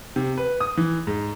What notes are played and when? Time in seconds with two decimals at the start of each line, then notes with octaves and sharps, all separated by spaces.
0.16 C3
0.37 B4
0.60 D#6
0.77 E3
1.07 G#2